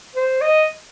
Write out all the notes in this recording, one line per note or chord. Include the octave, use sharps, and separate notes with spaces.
C5
D#5